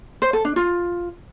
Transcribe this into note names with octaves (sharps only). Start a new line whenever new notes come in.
C5
A4
D4
F4